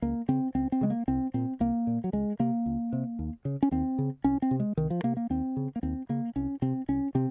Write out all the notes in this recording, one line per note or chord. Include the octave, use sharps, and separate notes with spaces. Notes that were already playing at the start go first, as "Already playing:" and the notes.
C#2 A#3
C#3 C4
C#2 C4
C4
C#3 G#3
A#3
C2 C4
A#2 C4
C2 A#3
A#2
F#3
C#2 G#3
C3 A#3
C#2
C3
D#2
C#3
C#4
D#2 C4
C#3
C2 C#4
C4
C3
G#3
C2 D#3
F3
C3 A#3
A#3
D#2 C4
C#3
A#3
D#2 C4
C#3 A#3
C2 C#4
C3 C4
C2 C#4
C3 C4